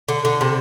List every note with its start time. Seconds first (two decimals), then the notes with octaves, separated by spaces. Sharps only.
0.09 D3
0.25 D3
0.41 C3